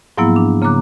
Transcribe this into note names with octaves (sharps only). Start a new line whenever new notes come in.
G#2 F3 F#3 A#3 B3 E4
D4
C#3 A#3 A#5 D6 F#6